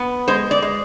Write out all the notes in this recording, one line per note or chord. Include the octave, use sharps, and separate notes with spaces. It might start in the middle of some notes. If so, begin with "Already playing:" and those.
Already playing: B3
G#3 C5
D5
G#3